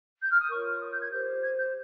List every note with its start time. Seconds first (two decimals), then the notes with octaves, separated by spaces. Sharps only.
0.21 G6
0.31 F6
0.40 D#6
0.50 F4 A#4 C#5 C#6
0.81 D#6
0.91 G6
1.02 G#6
1.12 G4 C5 G6
1.43 G#6
1.58 G6